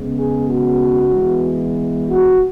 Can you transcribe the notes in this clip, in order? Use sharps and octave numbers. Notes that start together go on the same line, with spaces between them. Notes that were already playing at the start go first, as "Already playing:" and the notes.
Already playing: C#3 G#3 B3
G#4
F#4
E3 G#3 B3
F#4